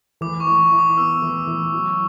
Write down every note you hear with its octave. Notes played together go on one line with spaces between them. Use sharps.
E3 D6
C#6
E3
E4
D6
B3 E6
E3
E3
F#3